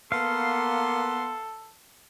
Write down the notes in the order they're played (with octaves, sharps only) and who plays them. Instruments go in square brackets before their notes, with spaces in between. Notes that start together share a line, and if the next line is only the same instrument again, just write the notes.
[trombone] A#3 [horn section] B3 C6 [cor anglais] A4 [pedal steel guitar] F5